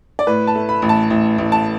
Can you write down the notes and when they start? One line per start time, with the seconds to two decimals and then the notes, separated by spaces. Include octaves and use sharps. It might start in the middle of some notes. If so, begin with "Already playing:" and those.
0.19 D5
0.27 A2 B4
0.47 A5
0.55 A3
0.69 B5
0.82 A1
0.89 A5
1.10 A1
1.38 A1
1.52 A5